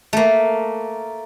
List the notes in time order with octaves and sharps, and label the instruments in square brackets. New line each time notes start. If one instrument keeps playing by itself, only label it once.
[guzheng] A3 A#3